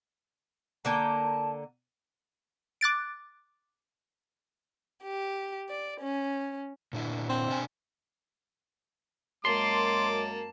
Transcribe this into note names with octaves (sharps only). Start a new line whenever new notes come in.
D3 A#3 G5 A5
D6 F#6 A6 D7
G4
D5
C#4
A#2 D4 E4
C4
B2 D4 G#5
F#2 G#3 A#3 A5 C6 D6